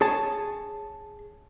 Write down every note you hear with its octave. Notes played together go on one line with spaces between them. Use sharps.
G#4 C#5 A5